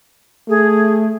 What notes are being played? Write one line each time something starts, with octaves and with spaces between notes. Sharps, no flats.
A3 G#4